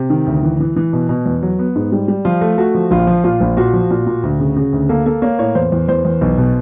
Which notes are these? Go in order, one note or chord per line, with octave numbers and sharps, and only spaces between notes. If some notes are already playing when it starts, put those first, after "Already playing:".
Already playing: C3
D#3
D2
E3
E3
E3
B2
B2
E2
F#3
B3
G#2
G3
G3
F3 F4
A3
A3 F#4
F3
A#1 F4
F3
A#2 F4
A#1
A#2 F#4
F3
A#2
A#2
D2
C#3
C#3
D2
A#3 A4
A#3 A4
A#3 C#5
A2 C#5
E2 C5
E2
E2 C5
E2
B1
B2